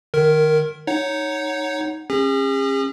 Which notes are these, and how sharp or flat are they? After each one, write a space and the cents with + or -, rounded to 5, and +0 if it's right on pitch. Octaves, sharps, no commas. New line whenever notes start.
D#3 -30 A#4 +0
D#4 +0 C#5 +0 F#5 +0
C#4 -30 G#4 -45